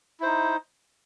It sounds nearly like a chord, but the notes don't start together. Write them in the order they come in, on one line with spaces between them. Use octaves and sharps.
E4 C5 D#4